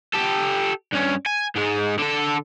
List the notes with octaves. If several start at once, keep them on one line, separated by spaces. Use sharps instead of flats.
G4 A4
G2 C#4
G#5
G#2 G#3
D3 A4